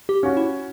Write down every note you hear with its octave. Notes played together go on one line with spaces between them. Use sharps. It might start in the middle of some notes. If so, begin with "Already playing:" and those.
G4
C#4 F#4
E4